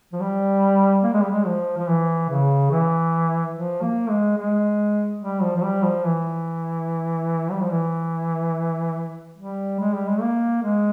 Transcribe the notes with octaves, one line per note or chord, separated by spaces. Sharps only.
F3
G3
A#3
G#3
G3
G#3
F3
F3
E3
C#3
E3
F3
A#3
G#3
G#3
G3
F3
F3
G3
F3
E3
G3
F3
E3
G3
G#3
G3
G#3
A#3
G#3